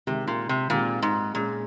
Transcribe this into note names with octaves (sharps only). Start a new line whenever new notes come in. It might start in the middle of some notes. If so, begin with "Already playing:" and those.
C3 D#3 G#3 C4 G4
A#2
C3
A#2 D#3 G#3 C4 G4
G#2
A#2 G#3 C#4 G#4